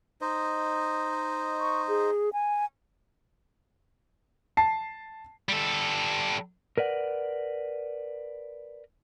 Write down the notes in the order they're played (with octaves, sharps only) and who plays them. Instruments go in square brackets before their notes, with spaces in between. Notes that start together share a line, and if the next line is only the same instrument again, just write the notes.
[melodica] D#4 C5 D#5
[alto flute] C#6
G#4
G#5
[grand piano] A5 C7
[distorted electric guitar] G3 A4
[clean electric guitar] A#4 B4 D5 F#5